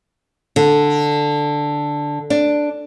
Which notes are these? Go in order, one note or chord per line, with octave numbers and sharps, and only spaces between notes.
D3
D4